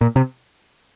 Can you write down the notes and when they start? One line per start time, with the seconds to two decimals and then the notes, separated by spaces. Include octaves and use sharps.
0.01 A#2
0.16 C3